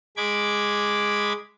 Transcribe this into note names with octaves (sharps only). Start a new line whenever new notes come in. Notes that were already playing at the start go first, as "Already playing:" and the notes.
G#3 B5 D6 G#6